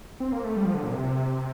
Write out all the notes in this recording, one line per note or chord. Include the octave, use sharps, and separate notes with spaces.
C4
A#3
A3
G3
F3
D3
A#2
C3